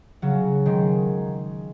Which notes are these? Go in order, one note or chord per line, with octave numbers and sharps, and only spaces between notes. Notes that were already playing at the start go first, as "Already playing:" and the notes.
C#3 F#3
D#3 G#3